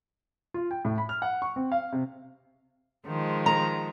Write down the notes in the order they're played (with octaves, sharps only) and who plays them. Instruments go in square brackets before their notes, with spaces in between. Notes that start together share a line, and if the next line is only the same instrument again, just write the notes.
[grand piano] F4
G5
A2
B5
F6
F#5
C#6
C4
F5
C3
[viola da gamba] D#3 F3 G#3
[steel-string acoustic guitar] A#5